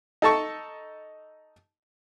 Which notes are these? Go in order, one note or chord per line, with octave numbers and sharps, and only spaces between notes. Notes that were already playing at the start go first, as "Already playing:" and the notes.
D#4 A4 A5 C#6